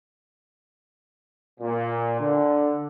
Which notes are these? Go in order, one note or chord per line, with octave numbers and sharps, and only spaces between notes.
A#2
D3